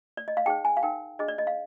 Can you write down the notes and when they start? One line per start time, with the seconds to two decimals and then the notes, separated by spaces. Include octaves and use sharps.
0.17 D5
0.28 D#5
0.37 F5
0.46 D#4 G#4 C5 G5
0.65 G#5
0.77 F5
0.83 D#4 A#4 G5
1.19 D4 G#4 C5 D#5
1.28 D5
1.38 D#5
1.47 F5